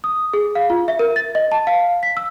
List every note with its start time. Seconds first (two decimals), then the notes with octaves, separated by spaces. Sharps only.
0.04 D#6
0.34 G#4
0.55 F5
0.70 F4
0.88 E5
0.99 A#4
1.16 A6
1.35 D#5
1.52 A5
1.67 F5
2.03 B6
2.17 E6